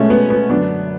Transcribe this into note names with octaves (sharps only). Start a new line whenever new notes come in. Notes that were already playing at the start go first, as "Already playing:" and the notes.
Already playing: B2 G#3 A3 C#4
B3
B3
F#2 D3 F#3 B3 D4